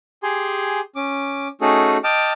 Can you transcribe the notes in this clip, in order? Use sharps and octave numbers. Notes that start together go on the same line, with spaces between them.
G4 G#4 G#5 C6
C#4 D6
A3 C#4 D#4 F#4 G#4 A4
D#5 G5 A5 D6 F6